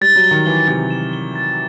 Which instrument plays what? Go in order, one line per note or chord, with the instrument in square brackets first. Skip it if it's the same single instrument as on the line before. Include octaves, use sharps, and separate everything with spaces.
[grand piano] G3 [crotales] A6
[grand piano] F#3
[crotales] G7
[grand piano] D#3
[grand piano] E3 [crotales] G7
[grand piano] C3 [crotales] A6
[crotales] E7
G7
A6